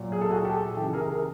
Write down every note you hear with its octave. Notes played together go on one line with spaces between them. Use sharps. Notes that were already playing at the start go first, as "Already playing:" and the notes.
Already playing: A#2 F#3
G#4
A4
F#4 G#4
G4 A4
C#3 E3 G4 A4
G#4 A#4
G#4 A#4